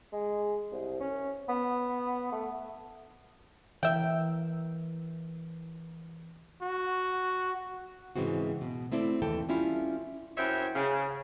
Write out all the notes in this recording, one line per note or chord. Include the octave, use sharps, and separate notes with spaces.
G#3
C2
C#4
B3
A3
E3 A#4 E5 G5
F#4
G#2 C#3 E3 G#3 C4 F#4
B2
A3 C4 E4 A4 D5
D#2 E3 A4 G5
G3 C#4 E4 F4
F#2 E4 C5 C#5 E5 G5
C#3